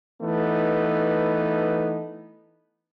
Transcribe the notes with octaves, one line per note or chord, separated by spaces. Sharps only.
E3 A3 B3 D#4